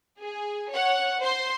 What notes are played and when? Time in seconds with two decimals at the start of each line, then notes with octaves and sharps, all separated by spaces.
0.21 G#4
0.73 C#5 F#5
1.20 C5 C6